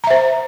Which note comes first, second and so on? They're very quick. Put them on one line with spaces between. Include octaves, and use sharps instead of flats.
A#5 E5 C5